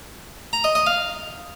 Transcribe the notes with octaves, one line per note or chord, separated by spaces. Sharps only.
A#5
D#5
D#5
F5